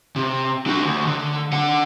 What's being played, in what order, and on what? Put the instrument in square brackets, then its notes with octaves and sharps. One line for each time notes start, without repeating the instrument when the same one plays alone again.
[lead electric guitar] C3
D4 F#4
D2
D3
D3 F#5